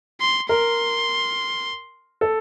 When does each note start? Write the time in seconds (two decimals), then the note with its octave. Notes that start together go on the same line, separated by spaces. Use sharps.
0.21 C6
0.49 A#4 C6
2.21 A4